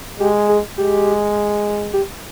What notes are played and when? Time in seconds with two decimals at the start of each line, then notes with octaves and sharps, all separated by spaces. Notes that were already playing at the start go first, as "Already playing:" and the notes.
0.19 G#3 G4
0.49 G#4
0.78 G#3 G4
1.93 G4